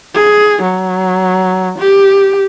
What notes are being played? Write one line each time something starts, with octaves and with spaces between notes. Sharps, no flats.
G#4
F#3
G4